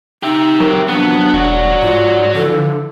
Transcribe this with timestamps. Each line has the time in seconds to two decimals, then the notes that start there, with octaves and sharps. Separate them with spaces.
0.23 D#4 G4 E5
0.60 F#3 C4 A#4
0.89 C3 D#3 F3 B3 D4
1.34 E1 F#4 C#5 D5
1.83 G#2 F4
2.35 D3 E3 F3 A4